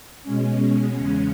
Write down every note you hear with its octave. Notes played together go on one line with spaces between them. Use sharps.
B2 G#3 C#4
E2 C#3 G#3 C#4